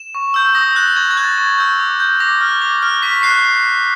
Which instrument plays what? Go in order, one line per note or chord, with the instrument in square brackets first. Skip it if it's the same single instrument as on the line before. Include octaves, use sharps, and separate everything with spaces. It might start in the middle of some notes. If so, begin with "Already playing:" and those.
Already playing: [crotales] E7
C#6
E6 G6
D#6 A#6
F#6 A6
C#6 G#6
G#6
F#6
A6
C#6 G#6
E6 G6
D6
G6
D6 A#6
F6
D6
F6
C#6 B6
F#6 C7